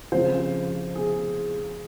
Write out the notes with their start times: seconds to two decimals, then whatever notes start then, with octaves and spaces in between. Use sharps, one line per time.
0.12 F2 C#3 F3 C5
0.96 G#4